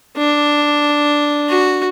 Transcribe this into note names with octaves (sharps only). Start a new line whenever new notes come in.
D4
F#4